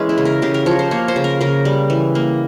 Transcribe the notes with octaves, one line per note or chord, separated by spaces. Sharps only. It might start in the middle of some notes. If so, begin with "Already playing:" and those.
Already playing: E3 G#3 A#3 C#4
E4
C#3
A#4
C#3 G4
A#4
F3 C#5
C5
A#3 C#5
C5
C#3
A#4
C#3 A#4
G3
E3
A#3